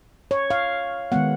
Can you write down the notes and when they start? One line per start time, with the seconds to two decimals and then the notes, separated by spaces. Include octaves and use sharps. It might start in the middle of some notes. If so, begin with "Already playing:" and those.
0.31 C#5
0.50 F5
1.12 D#3 G#3 B3 F#5